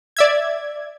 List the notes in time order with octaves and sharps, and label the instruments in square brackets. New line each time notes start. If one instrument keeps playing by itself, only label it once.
[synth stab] D5 E5 G#6